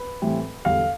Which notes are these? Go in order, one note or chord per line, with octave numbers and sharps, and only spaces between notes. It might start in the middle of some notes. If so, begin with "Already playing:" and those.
Already playing: B4
A2 E3 G3 C4
E2 D3 G3 F5